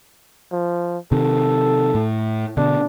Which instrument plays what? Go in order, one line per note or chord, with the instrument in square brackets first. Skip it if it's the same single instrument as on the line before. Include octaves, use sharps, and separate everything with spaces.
[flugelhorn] F3
[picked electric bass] C3 D#3 [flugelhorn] A4
[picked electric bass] A2
[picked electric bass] B2 D3 [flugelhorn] D4